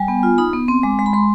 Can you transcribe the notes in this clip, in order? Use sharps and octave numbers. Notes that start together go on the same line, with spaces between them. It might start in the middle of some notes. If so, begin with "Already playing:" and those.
Already playing: G3 G#5
B3
F4
D#4 B5
B3
C4 C6
G#3 D6
G#3 C6
B5
G#3 C6